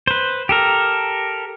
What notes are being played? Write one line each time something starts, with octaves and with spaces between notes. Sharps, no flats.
B4 C5
G4 A4 A#4